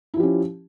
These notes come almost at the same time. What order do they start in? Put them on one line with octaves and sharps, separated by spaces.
E4 F3 G4 C#4